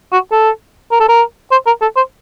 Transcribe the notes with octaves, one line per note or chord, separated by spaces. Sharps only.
F#4
A4
A#4
A4
A#4
C5
A#4
A4
C5